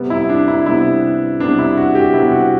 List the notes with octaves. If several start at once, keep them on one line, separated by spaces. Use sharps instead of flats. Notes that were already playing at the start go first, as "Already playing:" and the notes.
Already playing: C3 G3 B3
E4
D4
E4
C3 G3 B3 E4
C3 G3 B3 D4
E4
F#4
G4
C3 G3 B3 E4
F#4